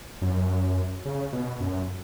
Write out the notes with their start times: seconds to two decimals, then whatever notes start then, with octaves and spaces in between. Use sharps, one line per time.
0.22 F#2
1.05 C#3
1.32 B2
1.60 F#2